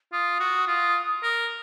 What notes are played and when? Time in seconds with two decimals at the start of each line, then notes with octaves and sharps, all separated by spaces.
0.12 F4 D#6
0.40 F#4
0.67 F4
1.23 A#4